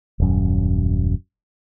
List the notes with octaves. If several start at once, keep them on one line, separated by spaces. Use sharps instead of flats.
D#1 F#2